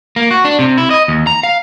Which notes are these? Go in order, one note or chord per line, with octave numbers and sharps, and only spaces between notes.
A#3
F#4
D4
C3
E4
D#5
D#2
A#5
F5